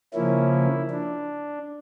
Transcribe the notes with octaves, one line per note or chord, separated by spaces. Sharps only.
C#3 F3 A#3 C#4 E4
D4